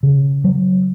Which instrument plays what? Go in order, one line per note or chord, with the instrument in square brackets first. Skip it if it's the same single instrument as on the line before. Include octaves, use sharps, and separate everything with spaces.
[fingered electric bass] C#3
F#3